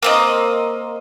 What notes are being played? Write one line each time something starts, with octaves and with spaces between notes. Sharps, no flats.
A#3 C4 D#5